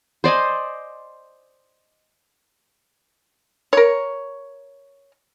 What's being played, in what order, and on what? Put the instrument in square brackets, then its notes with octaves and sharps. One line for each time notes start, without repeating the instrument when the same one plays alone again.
[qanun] C5 D5 D#5 G#5
[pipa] A#4 C#5